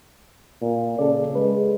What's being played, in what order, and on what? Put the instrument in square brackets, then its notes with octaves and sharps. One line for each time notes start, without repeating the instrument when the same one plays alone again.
[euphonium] A#2
[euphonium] C#3 [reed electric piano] A4 D5
[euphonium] G#3 [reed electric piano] B4